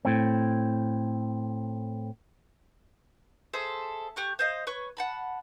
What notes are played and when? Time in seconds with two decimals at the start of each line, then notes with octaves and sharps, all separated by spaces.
0.05 A2 C4
3.54 G#4 A4 C5 E5
4.16 G4 C#6 F#6
4.39 C5 D#5 F5
4.67 B4 C#5 C#6
4.97 F#5 A5 B5